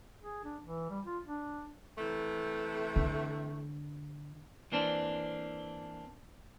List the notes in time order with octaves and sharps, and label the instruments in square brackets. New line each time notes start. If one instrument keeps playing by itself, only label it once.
[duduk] G#4
D4
E3
G3
F4
D4
[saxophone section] C3 E3 A3
[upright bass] D3
[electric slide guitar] E3 A#3 C4 D4